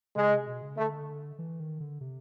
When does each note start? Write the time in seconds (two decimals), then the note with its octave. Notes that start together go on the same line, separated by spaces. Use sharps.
0.16 C#3 G#3
0.31 C3
0.47 B2
0.62 C#3
0.77 D3 A3
1.38 E3
1.60 D#3
1.80 D3
2.01 C3